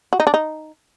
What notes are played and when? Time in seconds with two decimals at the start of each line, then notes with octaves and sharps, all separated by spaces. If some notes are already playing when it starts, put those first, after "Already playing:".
0.13 F#4
0.20 D#4
0.27 D4
0.34 D#4